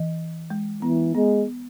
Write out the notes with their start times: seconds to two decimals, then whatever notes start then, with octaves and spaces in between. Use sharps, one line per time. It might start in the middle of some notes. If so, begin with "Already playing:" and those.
Already playing: E3
0.50 G#3
0.82 E3 B3
1.15 G#3 B3